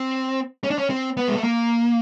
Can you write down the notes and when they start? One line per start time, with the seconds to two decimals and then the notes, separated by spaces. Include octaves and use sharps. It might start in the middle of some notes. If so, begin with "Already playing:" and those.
Already playing: C4
0.64 C#4
0.70 D4
0.78 C#4
0.90 C4
1.17 B3
1.28 G#3
1.36 A3
1.44 A#3